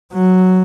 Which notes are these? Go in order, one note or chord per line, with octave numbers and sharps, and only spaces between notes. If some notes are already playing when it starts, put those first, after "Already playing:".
F#3